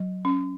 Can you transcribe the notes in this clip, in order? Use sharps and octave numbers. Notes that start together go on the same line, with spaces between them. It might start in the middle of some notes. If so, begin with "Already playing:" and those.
Already playing: F#3
C#4